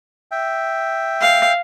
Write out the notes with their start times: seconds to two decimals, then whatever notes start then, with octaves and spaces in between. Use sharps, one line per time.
0.31 E5 G5
1.21 F5